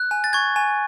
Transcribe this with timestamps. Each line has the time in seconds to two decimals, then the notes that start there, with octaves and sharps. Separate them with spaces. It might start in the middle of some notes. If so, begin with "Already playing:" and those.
Already playing: F#6
0.11 G#5
0.24 A6
0.33 C#6 G#6
0.56 G#5